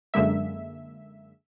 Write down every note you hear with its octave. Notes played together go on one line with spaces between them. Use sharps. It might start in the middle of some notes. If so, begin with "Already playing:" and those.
F#2 D3 G#3 A#3 E5